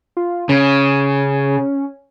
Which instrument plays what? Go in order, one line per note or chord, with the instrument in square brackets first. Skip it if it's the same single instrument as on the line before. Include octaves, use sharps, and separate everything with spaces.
[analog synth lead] F4
[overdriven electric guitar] C#3 [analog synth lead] C#4